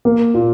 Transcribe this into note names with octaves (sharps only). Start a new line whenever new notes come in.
A#3
A#2